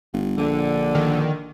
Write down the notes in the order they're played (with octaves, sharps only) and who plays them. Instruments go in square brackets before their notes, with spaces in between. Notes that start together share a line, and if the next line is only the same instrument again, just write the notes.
[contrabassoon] G1
[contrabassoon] A#1 [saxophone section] D3
[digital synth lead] D#3